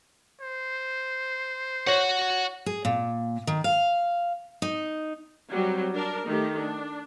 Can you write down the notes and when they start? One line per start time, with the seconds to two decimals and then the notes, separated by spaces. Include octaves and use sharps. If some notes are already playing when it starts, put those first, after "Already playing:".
0.41 C5
1.87 F#4 C#5 F#5
2.66 G#4
2.85 A#2
3.47 D#3
3.64 F5
4.62 D#4
5.49 F#3 G3 C4
5.91 D4 A#4
6.25 D#3 A3 G4
6.59 D4